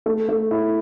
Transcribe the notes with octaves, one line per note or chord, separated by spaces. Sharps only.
A3
A3
E4